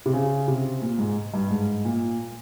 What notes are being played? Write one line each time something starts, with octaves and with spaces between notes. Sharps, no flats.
C3
C#3
C3
A#2
G#2
G2
G#2
A#2